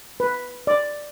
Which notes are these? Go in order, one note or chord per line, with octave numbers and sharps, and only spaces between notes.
B4
D5